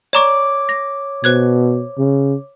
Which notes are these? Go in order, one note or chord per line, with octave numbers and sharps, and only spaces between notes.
C#5 D5 A#5 C#6 D6
A#6
B2 C5 F#6 G#6
C#3